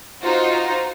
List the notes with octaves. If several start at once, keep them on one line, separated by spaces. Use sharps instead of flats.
D#4 F4 F#4 C5